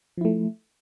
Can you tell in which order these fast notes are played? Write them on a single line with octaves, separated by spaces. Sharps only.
F3 E4 A3